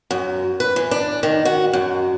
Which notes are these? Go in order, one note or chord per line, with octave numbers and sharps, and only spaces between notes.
F#2
B4
E3
D4
D#3
F#4
F#2